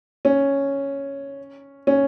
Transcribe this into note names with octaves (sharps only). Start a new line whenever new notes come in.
C#4
C#4